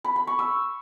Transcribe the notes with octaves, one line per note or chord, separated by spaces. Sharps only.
B5
B5
C#6
E6